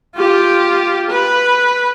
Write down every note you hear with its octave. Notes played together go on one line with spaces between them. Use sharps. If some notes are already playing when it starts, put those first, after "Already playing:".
F4 G4
B4